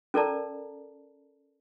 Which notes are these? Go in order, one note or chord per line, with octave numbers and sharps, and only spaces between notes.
C#4 A4 A#4 D5 A5 A#5